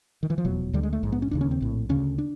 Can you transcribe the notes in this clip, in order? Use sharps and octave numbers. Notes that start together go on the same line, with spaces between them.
D#3
E3
F3
F1 E2 B2 F#3
D2 D3 G3
G#3
A3
A#1 G#2
B3
C#4
E1 D#2 C#3 D4
C#4
C4
A#1 A2
D2 C#3 C#4
D4